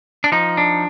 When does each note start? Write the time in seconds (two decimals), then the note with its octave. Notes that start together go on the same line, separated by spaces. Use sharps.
0.24 D4
0.32 F3 D#4
0.57 D4